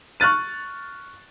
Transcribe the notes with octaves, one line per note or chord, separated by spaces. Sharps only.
C#6 F6 F#6 A6 D#7